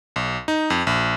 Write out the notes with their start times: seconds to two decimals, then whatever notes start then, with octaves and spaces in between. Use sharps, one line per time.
0.16 B1
0.48 D#4
0.70 F2
0.87 A#1